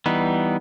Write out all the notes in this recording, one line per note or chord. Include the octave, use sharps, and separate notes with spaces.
E3 G3 B3 D#4